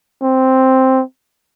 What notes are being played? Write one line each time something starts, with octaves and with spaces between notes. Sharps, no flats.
C4